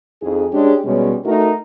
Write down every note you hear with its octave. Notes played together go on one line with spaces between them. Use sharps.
F2 D#4 G#4
G#3 C#4 D4 G4 G#4
B2 G3 G#3 C#4
A3 D#4 F#4 A#4